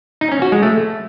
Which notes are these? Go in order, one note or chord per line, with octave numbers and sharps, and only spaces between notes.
D#4
C#4
F#4
G#3
A3